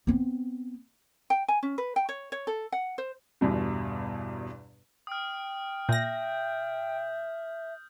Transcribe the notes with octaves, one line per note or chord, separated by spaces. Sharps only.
B3 C4
G5
G#5
C#4
B4
G5
C#5
C#5
A4
F#5
C5
G1 E2 G2 B2
G5 D#6 F6
A#2 E5 G6 A#6